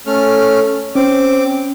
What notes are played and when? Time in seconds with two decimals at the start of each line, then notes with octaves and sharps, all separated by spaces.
0.06 A3 C#4 F6
0.95 C4 C#4 D6